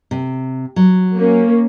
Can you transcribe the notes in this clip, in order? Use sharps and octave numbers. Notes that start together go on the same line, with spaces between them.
C3
F#3
A#3 C#4